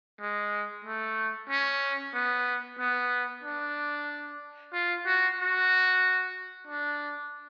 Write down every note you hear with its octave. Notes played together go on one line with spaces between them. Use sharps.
G#3
A3
C#4
B3
B3
D4
F4
F#4
F#4
D4